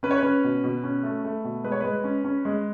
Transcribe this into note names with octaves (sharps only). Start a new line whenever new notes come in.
C#4 B4
C#5
C#4 B4
B2
B2
C#4
A3
A3
B2
G#3 B4
C#5
G#3 B4
C#4
C#4
G#3